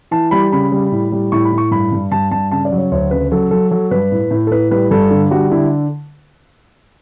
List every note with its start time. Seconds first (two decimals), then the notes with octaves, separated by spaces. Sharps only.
0.11 E3 A5
0.31 G3 B5
0.52 C#3 B5
0.72 G3
0.92 A2
1.12 G3
1.32 A2 C#6
1.45 B5
1.52 A2
1.58 C#6
1.71 G2 B5
1.92 G2
2.11 G2 A5
2.31 G2 A5
2.51 C#3 A5
2.65 D5
2.72 F#3
2.78 C#5
2.92 D2 C#5
3.11 C#3 B4
3.32 F#3 A4
3.51 F#3 A4
3.71 F#3 A4
3.91 G2 B4
4.12 A2
4.31 A2
4.47 A4
4.51 A2 B4
4.71 G3 B4
4.91 G2 A4
5.11 D3
5.31 G3 F#4
5.51 D3 E4